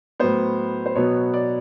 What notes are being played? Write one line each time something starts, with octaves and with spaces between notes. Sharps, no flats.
A2 F#3 B3 C5
C5
B2 F#3 B3 C#5
D5